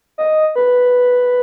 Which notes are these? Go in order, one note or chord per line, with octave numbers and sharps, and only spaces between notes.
D#5
B4